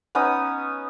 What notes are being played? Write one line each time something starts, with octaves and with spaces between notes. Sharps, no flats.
B3 C#4 D#4 D#6